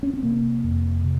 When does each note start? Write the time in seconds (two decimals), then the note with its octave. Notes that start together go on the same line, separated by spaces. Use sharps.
0.03 C#4
0.13 C4
0.23 C3 A#3
0.64 F2
1.04 C3